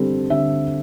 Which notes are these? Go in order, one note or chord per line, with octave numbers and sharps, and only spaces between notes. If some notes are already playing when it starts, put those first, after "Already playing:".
Already playing: D3 G3 C4 A4
D3 E5